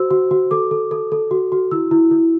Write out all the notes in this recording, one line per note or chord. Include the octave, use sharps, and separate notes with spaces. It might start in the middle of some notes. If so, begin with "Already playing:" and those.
Already playing: F#4 C5 E6
F#4
F#4
A4 D6
A4
A4
A4
F#4
F#4
E4 E6
E4
E4